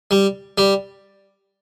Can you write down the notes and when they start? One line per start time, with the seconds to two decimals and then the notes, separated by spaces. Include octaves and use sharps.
0.11 G3
0.58 G3